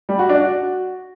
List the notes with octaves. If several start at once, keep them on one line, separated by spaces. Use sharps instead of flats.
G3
F#4
D4
F#4